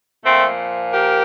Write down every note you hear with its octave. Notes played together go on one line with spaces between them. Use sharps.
A#2 F3 A3 C4
G4 A#4